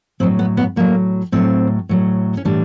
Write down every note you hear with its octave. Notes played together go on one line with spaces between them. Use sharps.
A2 F#3 C4
B3
B3
A2 F#3 A#3
A2 F#3 C4
A2 F#3
C#4
A2 E3 G3 D4